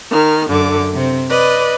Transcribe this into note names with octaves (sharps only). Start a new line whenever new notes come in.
D#3 F6
F#2 D3 D6
C3 C4
B4 D5 D#5